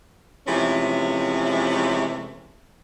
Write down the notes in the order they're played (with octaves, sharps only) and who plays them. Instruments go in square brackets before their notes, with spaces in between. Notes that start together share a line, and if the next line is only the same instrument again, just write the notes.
[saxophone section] C3 E3 F3 G#3 A3 C#4